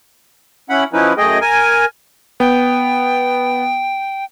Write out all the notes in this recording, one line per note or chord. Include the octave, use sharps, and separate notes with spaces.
C#4 E4 F#5 B5
F3 C#4 D#4 E4 B4
F#2 A3 G#4 D#5 G5
A#4 G#5
B3 G5